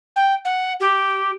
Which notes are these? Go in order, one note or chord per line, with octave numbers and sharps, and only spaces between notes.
G5
F#5
G4